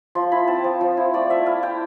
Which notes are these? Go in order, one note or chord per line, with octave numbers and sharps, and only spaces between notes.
F3 C6
E4 B5
C4 A5
F3
F3
E4
A3 D5
A3 E5
E4 F5
E4 G5